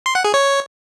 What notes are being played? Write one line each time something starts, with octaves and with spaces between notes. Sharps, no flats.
C6
F#5
G#4
C#5